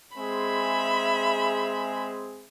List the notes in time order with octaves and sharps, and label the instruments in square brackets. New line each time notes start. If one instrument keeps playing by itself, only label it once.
[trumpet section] G#3 C4 G#4 [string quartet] E5 B5